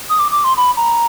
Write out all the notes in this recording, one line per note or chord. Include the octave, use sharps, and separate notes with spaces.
D#6
D6
D6
C6
B5
A#5